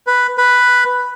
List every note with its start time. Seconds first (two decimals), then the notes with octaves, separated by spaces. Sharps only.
0.07 B4
0.38 B4